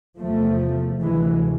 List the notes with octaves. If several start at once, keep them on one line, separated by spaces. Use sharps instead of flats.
E2 C3 F3 A3
D2 C3 E3 G#3